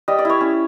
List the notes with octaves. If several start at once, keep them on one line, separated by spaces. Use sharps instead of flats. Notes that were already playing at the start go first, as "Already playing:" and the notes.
G3 D#5
D5
E4 C#5
C#4